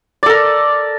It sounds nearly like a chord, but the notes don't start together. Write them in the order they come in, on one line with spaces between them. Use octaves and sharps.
D5 A4 A#4